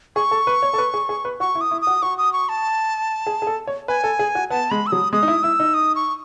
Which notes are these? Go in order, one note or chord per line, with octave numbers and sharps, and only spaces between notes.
G#4 C#6
A4
B4
C#5
A4
B4
G#4
G#4
B4
F#4 C#6
E4
D#6
E4
D#6
F#4
F#4 C#6
D#6
C#6
A5
G#4
G#4
A4
C#5
B4 G#5
A4
G#4
F#4
B3 A5
G#3 B5
E6
F#3 D#6
G#3 D#6
D#4
E4
E4 E6
D#4
D#6
C#6